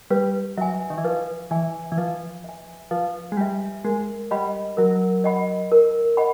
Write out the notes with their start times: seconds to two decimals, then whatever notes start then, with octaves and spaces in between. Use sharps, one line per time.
0.11 G3 B4
0.58 F#3 E5 G#5
0.90 D#3
0.98 E3
1.04 F3 B4
1.51 E3 E5 G#5
1.92 E3
1.97 F3 B4
2.44 E5 G#5
2.91 F3 B4
3.32 G#3
3.37 G3 E5 G#5
3.85 G#3 A#4
4.31 G3 D#5 F#5 B5
4.77 F#3 A#4
5.24 D#5 F#5 B5
5.72 A#4
6.17 D#5 F#5 B5